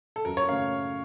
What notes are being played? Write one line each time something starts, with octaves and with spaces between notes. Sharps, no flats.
A4
F#2 A#4
C#5
C#3 A3 C#4 F5